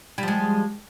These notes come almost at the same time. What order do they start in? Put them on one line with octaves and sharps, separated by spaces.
G3 F3 G#3